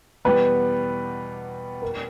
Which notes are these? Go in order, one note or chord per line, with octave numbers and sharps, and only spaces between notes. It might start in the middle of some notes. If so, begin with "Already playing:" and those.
E2 B2 G3 B3 G4 B4
A#4